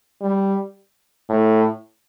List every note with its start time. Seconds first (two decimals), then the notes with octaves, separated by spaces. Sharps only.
0.22 G3
1.29 A2